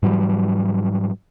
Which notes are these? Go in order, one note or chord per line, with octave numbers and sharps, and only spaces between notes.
G#2 E3 F#3 G3